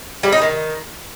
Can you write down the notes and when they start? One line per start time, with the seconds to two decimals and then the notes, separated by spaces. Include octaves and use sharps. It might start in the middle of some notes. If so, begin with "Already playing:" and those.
0.23 G3
0.32 D#4
0.42 D#3